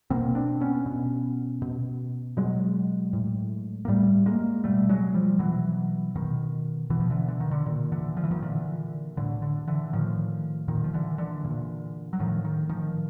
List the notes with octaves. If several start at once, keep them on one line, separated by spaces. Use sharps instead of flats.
B2 A#3 C4
C4 D4
B3 C#4
B2
B2
B2 F#3 G#3
A2
A#3
A2 G3 A3
G#3 A#3
B2 G3 A3
F#3 G#3
F3 G3
B2 E3 F#3
B2 D#3
B2 E3
F3
D3 E3
D3
D#3
D3
A#2 D#3
D3 E3
F3
E3
D#3 F3
A#2 D3 E3
A2 D3
D3
D3 E3
A2 D#3 F3
A#2 D#3
F3
D3 E3
D3 E3
A#2
F#3
A2 D#3 F3
D#3
D#3 F3